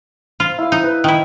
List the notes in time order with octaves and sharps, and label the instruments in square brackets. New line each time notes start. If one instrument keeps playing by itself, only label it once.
[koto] F4
[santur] E4 F5
[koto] D#4
[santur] B4
[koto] D#3 E4 [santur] D#5